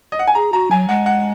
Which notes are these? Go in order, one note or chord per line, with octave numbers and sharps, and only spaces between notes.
D#5
F#5
G#5
G#4 A#5
F#4 A#5
F#3 G#5
G#3 F#5
F#5